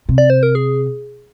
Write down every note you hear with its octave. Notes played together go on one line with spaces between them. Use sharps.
C3
D5
C5
A#4
G#4